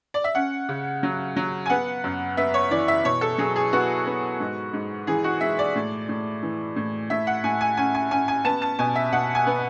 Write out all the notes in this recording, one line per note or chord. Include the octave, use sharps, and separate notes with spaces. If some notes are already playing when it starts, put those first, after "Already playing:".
D5
E5
C#4 F#5
C#3
F#3
F#3
G#5
B3 F#5
F#2
B3 E5
C#5
E3 D5
E5
B2 C#5
A4
F#3 G#4
G#4
B3 F#4
B3
G#2
G#2
E3 G#4
F#4
G#3 E5
D5
A2
A2
E3
A2
A2 E5
F#5
A2 G#5
G#5
C#4 G#5
G#5
C#4 G#5
G#5
B3 A5
A5
B2 G#5
E5
B2 F#5
G#5
B3